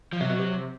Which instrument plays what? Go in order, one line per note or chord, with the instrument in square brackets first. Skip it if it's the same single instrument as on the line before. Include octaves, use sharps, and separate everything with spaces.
[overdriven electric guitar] F3
[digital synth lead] C3 [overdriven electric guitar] F#3
[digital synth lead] B2
C3